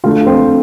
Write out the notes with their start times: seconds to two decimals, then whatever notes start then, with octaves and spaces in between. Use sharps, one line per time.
0.04 D3 A3 F4 F5
0.27 C4 C5